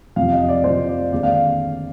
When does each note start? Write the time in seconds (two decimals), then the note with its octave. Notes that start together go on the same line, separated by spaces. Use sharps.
0.16 F2 C3 F3 F5
0.32 D#5
0.49 D5
0.64 F2 C3 F3 C5
0.88 D5
1.11 D#2 D3 G#3 C4 D5
1.23 F5